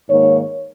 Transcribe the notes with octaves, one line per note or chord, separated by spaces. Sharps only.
G#2 D#3 A#3 C#5